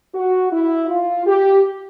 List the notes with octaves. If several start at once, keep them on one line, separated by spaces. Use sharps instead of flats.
F#4
E4
F4
G4